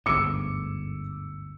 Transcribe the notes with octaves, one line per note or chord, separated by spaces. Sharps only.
G1 D2 G#2 D6 E6 C#7